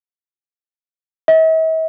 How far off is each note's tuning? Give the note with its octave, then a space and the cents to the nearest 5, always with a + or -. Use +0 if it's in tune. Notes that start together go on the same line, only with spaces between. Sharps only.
E5 -45